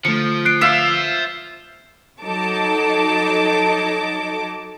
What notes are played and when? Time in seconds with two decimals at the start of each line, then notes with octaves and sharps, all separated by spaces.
0.05 D3 F3 A3 C#7
0.45 F#6 C7 D7
0.61 F4 C5 E5 F5
2.22 F#3 D#4 A4 A5 D6